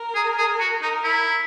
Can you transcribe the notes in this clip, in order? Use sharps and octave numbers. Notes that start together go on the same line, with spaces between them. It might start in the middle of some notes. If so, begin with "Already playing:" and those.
Already playing: A#4
G#4
G#4
F#4
D#4 A#4
E4